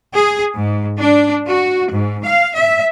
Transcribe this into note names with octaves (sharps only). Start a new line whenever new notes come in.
G#4
G#2
D4
F#4
G#2
F5
E5